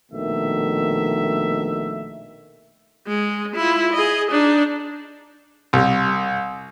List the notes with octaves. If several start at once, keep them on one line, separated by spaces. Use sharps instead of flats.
A#1 B2 D#3 A3 E5
G#3
E4 F4
G#4 D#5
D4 D#4
C2